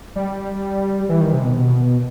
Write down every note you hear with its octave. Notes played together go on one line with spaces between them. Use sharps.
G3
E3
D#3
C3
B2